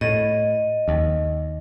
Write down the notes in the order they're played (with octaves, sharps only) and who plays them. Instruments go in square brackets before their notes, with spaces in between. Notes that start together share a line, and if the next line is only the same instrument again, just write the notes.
[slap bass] A2 [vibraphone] D#5
[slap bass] D#2